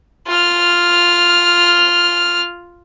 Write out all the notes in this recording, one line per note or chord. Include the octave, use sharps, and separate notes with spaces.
F4 F6